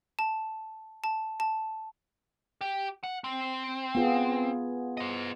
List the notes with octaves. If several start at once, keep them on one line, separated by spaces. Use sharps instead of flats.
A5
A5
A5
G4
F#5
C4
B3 F4 G#4
C5 D#5